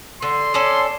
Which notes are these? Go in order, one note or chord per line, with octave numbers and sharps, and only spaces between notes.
D3 C6
C#4 A4 D5